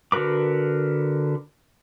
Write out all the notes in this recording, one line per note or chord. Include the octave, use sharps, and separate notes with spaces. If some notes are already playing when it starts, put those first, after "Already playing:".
D3 F#4 A#4 B4 D6